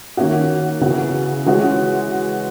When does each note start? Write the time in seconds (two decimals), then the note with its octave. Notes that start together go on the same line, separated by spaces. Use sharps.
0.17 D#3 A#3 C#4 F#4
0.81 C#3 E3 B3 F#4
1.46 E3 G#3 C#4 F#4